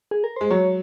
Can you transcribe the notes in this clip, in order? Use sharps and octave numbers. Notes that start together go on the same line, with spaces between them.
G#4
A#4
G#3 C5
F#3 C#5